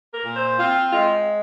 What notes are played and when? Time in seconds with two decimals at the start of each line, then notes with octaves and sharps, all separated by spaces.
0.12 A#4
0.24 A#2
0.36 C5
0.58 C4 F4
0.92 G#3 F4